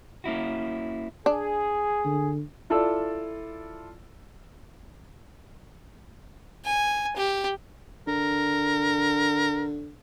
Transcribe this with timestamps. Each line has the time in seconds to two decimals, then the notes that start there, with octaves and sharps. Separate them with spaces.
0.24 A#3 C#4 E4 F#4
1.26 D4 G#4
2.05 D3
2.70 E4 F4 A4 D5 A5 E6
6.65 G#5
7.16 G4
8.08 D3 A#4